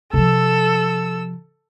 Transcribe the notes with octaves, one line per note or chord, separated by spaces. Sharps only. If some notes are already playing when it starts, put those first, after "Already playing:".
C3 F3 A4 E6